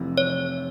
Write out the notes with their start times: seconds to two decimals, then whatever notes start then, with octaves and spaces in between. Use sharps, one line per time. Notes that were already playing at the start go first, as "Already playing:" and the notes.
Already playing: F1 F2 C3 E3
0.18 C#5